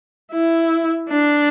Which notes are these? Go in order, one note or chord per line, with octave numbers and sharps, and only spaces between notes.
E4
D4